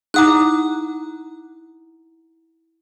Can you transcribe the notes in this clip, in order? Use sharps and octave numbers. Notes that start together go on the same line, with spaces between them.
D#4 E4 F#5 A#5 D6 D#6 F#6